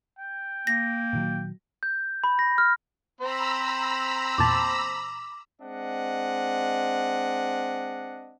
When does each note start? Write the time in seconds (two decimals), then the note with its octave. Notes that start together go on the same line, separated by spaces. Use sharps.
0.19 G5
0.67 A#3 A#6
1.13 A#2 D#3 F#3
1.83 G6
2.24 B5
2.39 A#6
2.58 F6
3.21 C4 C5 A#5 B5 E6
4.38 E2 A#2 A5 D6
5.62 G#3 C4 D4 D#5 F#5